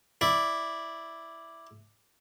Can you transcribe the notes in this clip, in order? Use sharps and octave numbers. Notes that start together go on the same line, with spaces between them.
E4 D5